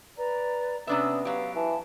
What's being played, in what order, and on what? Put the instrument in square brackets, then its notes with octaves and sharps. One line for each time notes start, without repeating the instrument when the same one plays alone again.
[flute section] B4 D5 A#5
[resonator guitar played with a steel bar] C3 D4 E5 [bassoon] B3 [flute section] C#4 D#6
[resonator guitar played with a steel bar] F#3 G4 [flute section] F5
[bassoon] E3 [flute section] A5